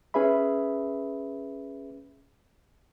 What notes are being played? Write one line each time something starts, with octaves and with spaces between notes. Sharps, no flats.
C#4 G#4 B4 E5 B5